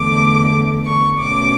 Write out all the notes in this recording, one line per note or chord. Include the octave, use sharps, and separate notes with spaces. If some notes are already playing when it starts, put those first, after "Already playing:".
Already playing: E2 D3 A3 D6
C#6
B2 A3 C#4 D6